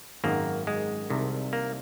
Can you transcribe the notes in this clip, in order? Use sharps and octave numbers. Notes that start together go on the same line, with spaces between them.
G#1 F#2 D#3 A#3
G#3
C2 C3 D#3
A#3